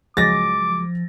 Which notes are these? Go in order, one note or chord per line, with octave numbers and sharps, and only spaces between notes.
C#2 F3 F#3 G#3 D6 A6 A#6